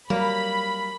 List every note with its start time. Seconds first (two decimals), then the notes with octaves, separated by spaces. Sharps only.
0.10 F#3 G3 A#3 B5